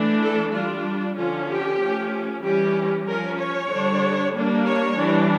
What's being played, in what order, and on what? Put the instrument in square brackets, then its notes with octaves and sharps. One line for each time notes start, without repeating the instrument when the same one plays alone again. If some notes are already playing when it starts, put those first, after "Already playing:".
Already playing: [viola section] E3 A3 D4
A4
G3 D4 F4
D3 F3 C#4 F4
G4
F3 A3 C#4
E3 G3 C#4 G4
F3 C#4 A#4
C#5
D3 G3 D4
G3 A#3 D4
C#5
E3 G3 D4